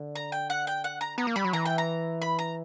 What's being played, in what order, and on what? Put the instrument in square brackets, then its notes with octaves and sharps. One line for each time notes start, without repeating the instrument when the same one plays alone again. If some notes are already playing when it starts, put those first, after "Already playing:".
Already playing: [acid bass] D3
[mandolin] A#5
G5
F#5
G5
F#5
A#5
[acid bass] B3 [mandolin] A#5
[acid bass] A#3
[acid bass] G3 [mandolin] B5
[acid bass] F#3
[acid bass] E3 [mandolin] A#5
[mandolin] G5
A#5
B5
A#5